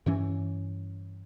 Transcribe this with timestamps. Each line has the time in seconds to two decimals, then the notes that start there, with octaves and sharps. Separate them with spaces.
0.06 G2 E3 C#4